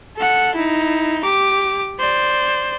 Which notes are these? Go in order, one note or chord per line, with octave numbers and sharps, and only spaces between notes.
A4 F#5
D#4 E4
G4 D6
C5 D5